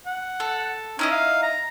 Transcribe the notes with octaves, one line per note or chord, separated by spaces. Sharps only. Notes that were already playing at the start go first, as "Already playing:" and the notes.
F#5
A4
C#4 D#4 E4 D#5
F5
A#5